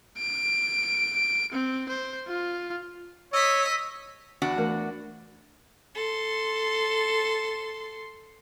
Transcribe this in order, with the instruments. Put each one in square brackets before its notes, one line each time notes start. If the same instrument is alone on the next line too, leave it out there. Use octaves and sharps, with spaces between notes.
[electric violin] D7
C4
C5
F4
[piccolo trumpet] C#5 [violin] D#5 B6 [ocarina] E6
[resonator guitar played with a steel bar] E2 D4 F#4
[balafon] E3 A3 A#4
[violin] A4 C6